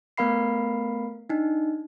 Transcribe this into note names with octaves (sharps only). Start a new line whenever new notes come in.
A3 B3 A#4 F5 B5 C7
D4 D#4